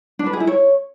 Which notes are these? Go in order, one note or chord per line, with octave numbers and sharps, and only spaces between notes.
D4
B4
G#4
E4
C#5